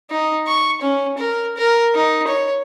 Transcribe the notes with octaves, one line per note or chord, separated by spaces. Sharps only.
D#4
C#6
C#4
A#4
A#4
D#4
C#5